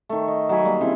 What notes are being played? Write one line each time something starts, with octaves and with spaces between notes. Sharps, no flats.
D#3 A3
D#5
F#3 D#5 G#5 B5
G3 A#3
C#3 E3 C4